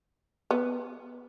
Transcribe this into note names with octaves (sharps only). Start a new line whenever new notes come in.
B3